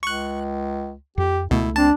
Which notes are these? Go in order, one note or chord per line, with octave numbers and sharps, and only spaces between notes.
C#2 C#6 F#6
F2 G4
C#2 B2 A3 E4
C4 D4 A5